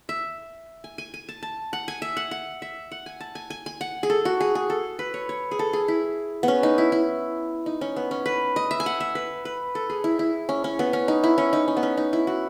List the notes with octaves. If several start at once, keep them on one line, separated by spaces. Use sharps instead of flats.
E5
G#5
G#5
G#5
A5
A5
F#5
G#5
E5
F#5
F#5
E5
F#5
G#5
A5
G#5
G#5
G#5
F#5
G#4
A4
F#4
G#4
G#4
A4
B4
C#5
C#5
G#4
A4
G#4
E4
B3 C#4
D#4
E4
E4
D#4
C#4
B3
C#4
B4
D#5
E5
G#5
F#5
E5
B4
B4
A4
G#4
E4
E4
C#4
C#4
B3
C#4
D#4
E4
C#4
D#4
C#4
B3
C#4
D#4
E4
F#4